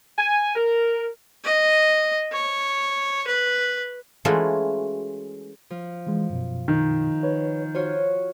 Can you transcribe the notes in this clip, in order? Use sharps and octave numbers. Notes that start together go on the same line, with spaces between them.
G#5
A#4
D#5
C#5
B4
E3 G#3 A3 C#4 F4 F#4
F3
E3 G#3
F#2 B2
D#3
B4 C#5
F4 F#4 C5 C#5